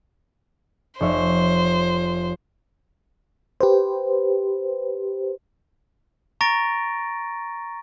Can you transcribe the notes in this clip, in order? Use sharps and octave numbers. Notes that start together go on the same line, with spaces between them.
F1 C5 C#5 E5
G4 B4 C5
A#5 C#6 A6 A#6 D7